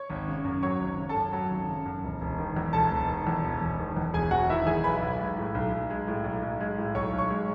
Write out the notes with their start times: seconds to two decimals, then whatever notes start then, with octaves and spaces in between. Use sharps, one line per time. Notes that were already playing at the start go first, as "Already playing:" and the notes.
Already playing: C#5 C#6
0.10 G#1
0.28 C#3
0.45 F#2
0.62 F#3 C#5 C#6
0.80 G#1
0.98 C#3
1.09 A4 A5
1.16 F#2
1.33 F#3
1.51 G#1
1.68 C#3
1.86 F#2
2.03 E1
2.21 E1
2.38 D#3
2.56 E2
2.73 E1 A4 A5
2.91 E1
3.08 D#3
3.27 E2
3.44 E1
3.61 E1
3.79 D#3
3.97 E2
4.14 E1 G#4 G#5
4.31 E1 F#4 F#5
4.49 D#3 E4 E5
4.67 E2 G#4 G#5
4.84 B1 B4 B5
5.02 B1
5.19 G#3
5.37 A2
5.55 B1
5.72 B1
5.90 G#3
6.08 A2
6.24 B1
6.42 B1
6.60 G#3
6.78 A2
6.95 B1 C#5 C#6
7.13 B1
7.18 C#5 C#6
7.30 G#3